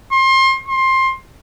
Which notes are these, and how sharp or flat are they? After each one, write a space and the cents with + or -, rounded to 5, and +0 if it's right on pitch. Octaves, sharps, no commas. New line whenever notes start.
C6 +30
C6 +20